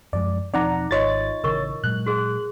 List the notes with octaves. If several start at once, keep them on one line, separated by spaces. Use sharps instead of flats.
F#2 F3 G#3 D5
E1 F3 C4 D#4 D5 F#5 A#5
G#1 F4 F#4 C#5 D#5 A6
A1 C#3 E3 A#4 C#6
A#2 F#3 G#3 F#6
F#4 G#4